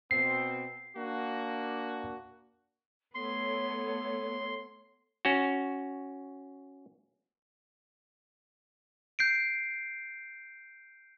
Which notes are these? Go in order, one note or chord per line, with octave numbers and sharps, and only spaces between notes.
B2 C4 C7
A#3 D4 F#4
A3 B3 A4 C#5 C6
C#4 F#4
G6 C7 D7